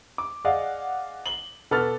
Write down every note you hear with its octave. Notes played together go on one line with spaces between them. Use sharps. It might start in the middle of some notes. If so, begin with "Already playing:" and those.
D6
G#4 D5 D#5 F5 F#5
F#7 G7
B2 A4 B4 D6 F6 A6